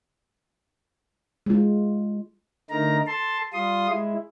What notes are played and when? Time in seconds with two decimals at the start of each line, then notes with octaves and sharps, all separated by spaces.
1.46 G#3 F4
2.70 D3 A3 D#4 A#4 A#5
3.07 A4 A5 C6
3.53 G3 F4 C6 D#6
3.88 G#3 E4